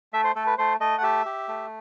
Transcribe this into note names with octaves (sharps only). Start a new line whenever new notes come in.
A3 E5
C5
A3 A4
B4
A3 C5
A3 D#5
F#5
G4 E5
G4
A3